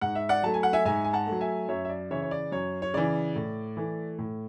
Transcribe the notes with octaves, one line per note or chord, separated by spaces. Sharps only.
G#2 F#5
E5
D5 F#5
F#3 A3 A5
G#5
F#5
E5 G#5
G#2 E5 G#5
G#5
F#5 A5
F#3 A3
E5 G#5
F#2 C#5 E5
E5
D5
C#3 E3 C#5 E5
C#5
D5
F#2 C#5
C#5
C#3 E3 D5
A2
E3 A3
A2